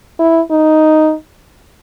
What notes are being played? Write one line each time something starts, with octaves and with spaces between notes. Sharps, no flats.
E4
D#4